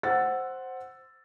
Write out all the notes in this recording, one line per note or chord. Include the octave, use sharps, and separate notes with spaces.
C5 F#5 E6 A6